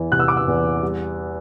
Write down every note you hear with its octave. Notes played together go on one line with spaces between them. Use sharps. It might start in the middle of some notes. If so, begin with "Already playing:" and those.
Already playing: E2 E3
C3 F#6
E6
D6
E6
E2
G3